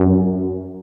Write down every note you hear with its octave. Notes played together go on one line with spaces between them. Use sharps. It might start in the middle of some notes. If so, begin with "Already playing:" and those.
Already playing: F#2